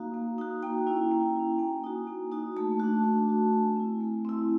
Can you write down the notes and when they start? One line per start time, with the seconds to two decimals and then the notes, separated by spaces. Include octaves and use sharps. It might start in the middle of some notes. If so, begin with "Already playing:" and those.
Already playing: A#3 D#4 F#4 F5
0.14 A#3
0.38 D#4 F#4
0.63 A#3 G5
0.87 C#4 E4
1.11 A#3
1.36 C#4 E4
1.59 A#3 G#5
1.84 D#4 F#4
2.07 A#3
2.32 D#4 F#4
2.57 A3 A5
2.80 D4 F#4
3.04 A3
3.29 D4 F#4
3.53 A3 G#5
3.76 C4 E4
4.00 A3
4.25 C4 E4